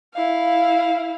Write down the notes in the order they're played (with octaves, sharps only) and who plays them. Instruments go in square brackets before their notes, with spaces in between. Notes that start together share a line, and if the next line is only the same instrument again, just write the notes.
[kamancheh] E4 F5